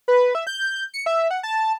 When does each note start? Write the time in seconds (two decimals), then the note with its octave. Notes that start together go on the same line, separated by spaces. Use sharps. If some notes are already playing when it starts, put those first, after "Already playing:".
0.08 B4
0.35 E5
0.47 G6
0.94 C#7
1.06 E5
1.31 F#5
1.43 A5